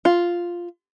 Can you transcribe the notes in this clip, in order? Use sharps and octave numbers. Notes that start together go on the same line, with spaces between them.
F4